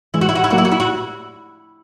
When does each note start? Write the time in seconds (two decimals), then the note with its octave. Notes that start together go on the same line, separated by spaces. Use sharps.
0.14 E3 G#3 E4
0.21 F#4
0.29 E4
0.35 F#4
0.44 E4
0.51 F#3 A#3 F#4
0.58 E4
0.65 F#4
0.71 E4
0.80 F#4